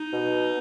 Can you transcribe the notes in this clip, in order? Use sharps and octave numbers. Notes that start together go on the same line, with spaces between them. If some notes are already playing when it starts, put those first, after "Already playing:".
Already playing: D#4
B2
B3